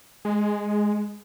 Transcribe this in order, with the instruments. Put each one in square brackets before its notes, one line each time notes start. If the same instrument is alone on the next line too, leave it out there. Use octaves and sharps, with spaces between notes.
[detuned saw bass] G#3